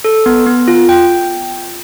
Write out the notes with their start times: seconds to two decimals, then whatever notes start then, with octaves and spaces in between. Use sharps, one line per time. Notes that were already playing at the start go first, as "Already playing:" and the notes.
0.05 A4
0.26 B3
0.46 B3
0.68 F4
0.89 G5